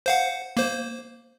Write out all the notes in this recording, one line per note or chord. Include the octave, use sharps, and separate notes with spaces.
C5 F5 F#5
A#3 C5